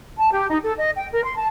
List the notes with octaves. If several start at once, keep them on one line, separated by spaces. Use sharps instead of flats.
A5
G4
D#4
A4
D#5
G5
A#4
C6
A5